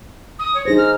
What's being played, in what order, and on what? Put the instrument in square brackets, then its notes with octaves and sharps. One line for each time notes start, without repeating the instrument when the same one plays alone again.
[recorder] D#6
C#5
[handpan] D#4 G#4 C5 [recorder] A#6
[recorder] F6